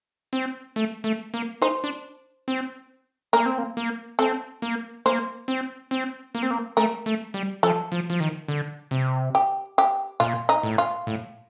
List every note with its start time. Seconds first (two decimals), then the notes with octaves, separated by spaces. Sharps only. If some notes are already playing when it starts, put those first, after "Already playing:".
0.33 C4
0.76 A3
1.04 A3
1.34 A#3
1.62 D#4 C5
1.84 D4
2.48 C4
3.33 A#3 A#4
3.46 C4
3.58 A#3
3.77 A#3
4.19 C4 A4
4.62 A#3
5.06 A#3 C5
5.48 C4
5.91 C4
6.35 A#3
6.43 C4
6.51 A#3
6.77 A3 A#4
7.06 A3
7.34 G3
7.63 F3 A4
7.92 F3
8.10 F3
8.20 D#3
8.48 D3
8.91 C3
9.35 G4
9.78 G4
10.20 A#2 F4
10.49 D#4
10.63 A2
10.78 F4
11.07 A2